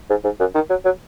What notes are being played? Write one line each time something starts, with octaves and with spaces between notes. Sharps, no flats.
G#2
G#2
F#2
D#3
F#3
F#3